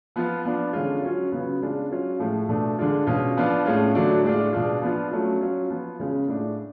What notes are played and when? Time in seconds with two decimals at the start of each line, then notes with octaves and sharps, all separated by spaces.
0.16 F3 B3 F4
0.45 F3 B3 D4
0.73 D3 G#3 C#4 F4
1.02 F#3 C#4 F4
1.32 C#3 F#3 B3
1.61 C#3 G#3 D4 F4
1.91 F#3 C#4 F4
2.19 A2 F3 G#3
2.49 B2 A3 D4
2.79 D3 G#3 D4 F4
3.07 B2 G#3 C#4 F4
3.37 F3 B3 D4 F4
3.65 A2 G#3 C#4 F4
3.95 D3 F#3 A3 D4
4.24 A2 G#3 D4 F4
4.53 B2 G#3 D4 F4
4.82 F3 B3 D4 F4
5.11 F#3 A3 C#4 F4
5.41 F#3 C#4 F4
5.70 F3 B3 F4
5.99 C#3 G#3 C#4 F4
6.28 A2 G#3 D4